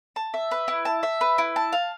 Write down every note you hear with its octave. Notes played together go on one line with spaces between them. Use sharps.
A5
E5
B4
E4
A5
E5
B4
E4
A5
F5